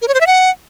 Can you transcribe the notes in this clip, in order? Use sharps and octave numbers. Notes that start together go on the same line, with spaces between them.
A#4
C#5
C5
E5
F#5